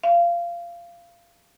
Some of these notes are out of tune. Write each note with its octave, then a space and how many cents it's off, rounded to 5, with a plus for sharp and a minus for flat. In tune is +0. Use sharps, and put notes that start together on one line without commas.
F5 -20